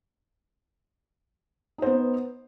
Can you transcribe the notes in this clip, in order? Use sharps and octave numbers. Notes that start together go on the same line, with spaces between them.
B3 D#4 C5